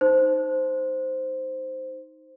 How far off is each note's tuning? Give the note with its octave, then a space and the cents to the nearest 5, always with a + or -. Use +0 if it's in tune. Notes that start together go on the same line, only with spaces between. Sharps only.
D#4 +0 C5 +0